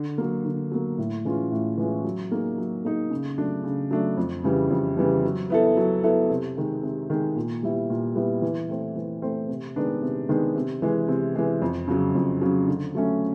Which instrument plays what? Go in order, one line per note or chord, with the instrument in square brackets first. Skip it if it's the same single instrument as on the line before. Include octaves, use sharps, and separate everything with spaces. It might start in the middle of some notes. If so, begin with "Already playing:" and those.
Already playing: [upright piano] D3
F#3 A#3
D3
F#3 A#3
A2
E3 G#3 C#4 F4
A2
E3 G#3 C#4 F4
F#3
A#3 D#4 G#4
F#3
A#3 D#4 G#4
C#3
F#3 A3 D4
C#3
F#3 A3 D4
F2
C#3 E3 G3
F2
C#3 E3 G3
F#3
B3 E4 A4
F#3
B3 E4 A4
C3
D#3 G#3
C3
D#3 G#3
A#2
G3 B3 E4
A#2
G3 B3 E4
E3
A3 C4
E3
A3 C4
C3
D#3 G#3 B3 D4
C3
D#3 G#3 B3 D4
C3
E3 G#3
C3
E3 G#3
F2
C#3 F#3
F2
C#3 F#3
D3
F#3 A3 C#4